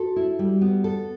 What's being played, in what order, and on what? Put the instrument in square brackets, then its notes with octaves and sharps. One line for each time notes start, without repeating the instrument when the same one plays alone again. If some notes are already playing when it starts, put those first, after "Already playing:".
Already playing: [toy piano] F#4 [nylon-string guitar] A4
[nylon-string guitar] E4
G3
B3
A4